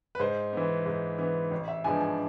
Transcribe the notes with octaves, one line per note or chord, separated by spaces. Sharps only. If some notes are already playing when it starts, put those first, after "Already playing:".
B4
G#2 C5
E3 B3
G#2
E3 B3
A1
E5
G#2 F3 B3 D4 G#5
G#5